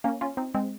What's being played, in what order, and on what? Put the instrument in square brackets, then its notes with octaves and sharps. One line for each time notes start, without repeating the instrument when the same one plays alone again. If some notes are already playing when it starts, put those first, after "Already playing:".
[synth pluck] A#3 C#4
C#4 F4
C4 D#4
G#3 C4